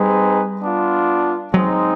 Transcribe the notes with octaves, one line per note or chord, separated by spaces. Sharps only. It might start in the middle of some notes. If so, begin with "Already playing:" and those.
Already playing: G3 C4 D#4 G#4 B4
B3 D4 F4
F#3 G#3 C4 D#4